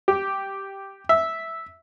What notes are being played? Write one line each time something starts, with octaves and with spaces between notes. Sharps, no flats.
G4
E5